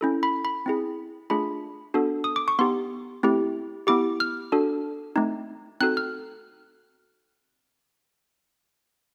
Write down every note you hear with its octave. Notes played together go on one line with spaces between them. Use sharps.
C#4 E4 A4
B5
B5
C4 E4 G#4
A3 D4 F4 G#4 B5
B3 D4 F#4 A4
D#6
D6
C#6
B3 D#4 G4 C6
A3 C4 E4 G4
B3 E4 G4 D6
F6
D4 F#4 A4
A3 C4 D#4
C4 D#4 F#4 A4 F#6
F6